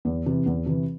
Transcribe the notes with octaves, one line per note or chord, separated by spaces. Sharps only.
E2
C3 E3
E2
C3 E3